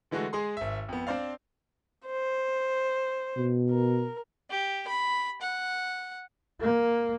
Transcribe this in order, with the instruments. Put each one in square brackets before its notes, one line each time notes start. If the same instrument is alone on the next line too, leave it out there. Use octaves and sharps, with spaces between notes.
[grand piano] D3 E3 G#3 A3 F#4
G#3 G#4 C6
G#1 E5
F2 B3
C4 D4 C5 D5 F5
[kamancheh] C5
[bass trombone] B2
[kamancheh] A#4
[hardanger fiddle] G4
B5
F#5
[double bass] A#3